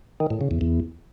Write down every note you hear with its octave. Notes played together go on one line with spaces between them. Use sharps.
D#3
A2
C#3
E2
E2